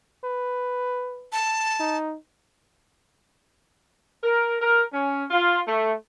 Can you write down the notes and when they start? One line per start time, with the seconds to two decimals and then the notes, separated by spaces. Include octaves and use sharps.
0.24 B4
1.32 A5
1.80 D#4
4.23 A#4
4.61 A#4
4.92 C#4
5.30 F4
5.67 A3